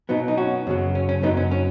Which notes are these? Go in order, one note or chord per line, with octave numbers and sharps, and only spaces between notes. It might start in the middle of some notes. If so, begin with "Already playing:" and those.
B2 F#3 B3 D#4
D#4
C#4 F#4
F#2 C#3 F#3
C#4
C#4
F#2 F#3 B3 D#4
C#4
C#4